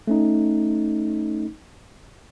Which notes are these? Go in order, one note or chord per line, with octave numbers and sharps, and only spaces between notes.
A3 C#4 D#4